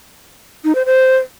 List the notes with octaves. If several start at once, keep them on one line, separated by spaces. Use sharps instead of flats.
D#4
C5
C5